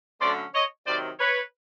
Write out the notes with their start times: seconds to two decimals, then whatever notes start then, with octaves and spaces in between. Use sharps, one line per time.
0.20 D3 F#3 A3 C#4 C5 D5
0.54 C#5 D#5
0.86 C3 D#3 F#3 C5 D5
1.20 B4 C#5